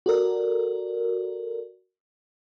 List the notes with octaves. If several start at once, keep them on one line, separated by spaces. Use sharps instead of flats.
F#4 A4 A#4 D5